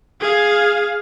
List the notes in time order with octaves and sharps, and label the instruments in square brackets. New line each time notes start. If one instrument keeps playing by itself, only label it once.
[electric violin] G#4 F5